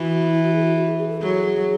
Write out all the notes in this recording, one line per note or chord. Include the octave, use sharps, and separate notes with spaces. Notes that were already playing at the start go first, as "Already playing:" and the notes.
Already playing: E3 F#4
E4
F#4
G#4
F#4
F#4
G#4
G#4
A4
F#3 G#4